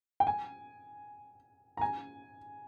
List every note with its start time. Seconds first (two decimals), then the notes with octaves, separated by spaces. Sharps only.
0.20 G5
0.27 G#5
1.77 A#5
1.81 G#5